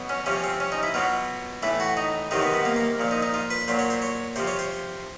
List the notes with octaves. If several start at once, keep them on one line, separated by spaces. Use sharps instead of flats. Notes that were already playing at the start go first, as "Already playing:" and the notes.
Already playing: B2 F#3
C#4
C3 F3 C#4
C4
C#4
D#4
E4
B2 F#3 F4
A2 E3 E4
F#4
D#4
C3 D#3 F#3 D#4
B3
B3
A#3
A#3
A#2 F3
D#4
D#4
F4
B4
A#2 F#3 C5
C#5
C5
C#5
C3 F3 C5
C#5
C5